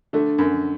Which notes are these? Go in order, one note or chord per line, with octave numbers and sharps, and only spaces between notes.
D3 A3
F#2